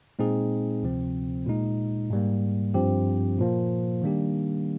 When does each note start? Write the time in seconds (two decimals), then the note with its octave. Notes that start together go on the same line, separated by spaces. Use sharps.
0.19 A#2 G#3 C4 D#4 G#4
0.83 D2 C3 F3 C4
1.46 A#2 G#3 D#4
2.10 G#2 G3 A#3
2.74 G2 F3 C4 G4
3.39 A#2 F3 A#3
4.02 D#3 G3 A#3 D4 G4